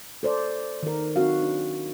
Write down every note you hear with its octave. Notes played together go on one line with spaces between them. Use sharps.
A4 C5 D5
D#3 A#4
C4 D#4 F#4 F5
D4